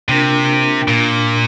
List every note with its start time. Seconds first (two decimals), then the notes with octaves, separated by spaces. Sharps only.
0.08 C3 A#3 D4 F4 A#4
0.88 A#2